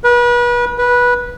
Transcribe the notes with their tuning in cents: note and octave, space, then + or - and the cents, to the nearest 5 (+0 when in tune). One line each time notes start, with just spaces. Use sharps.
B4 -35
B4 -15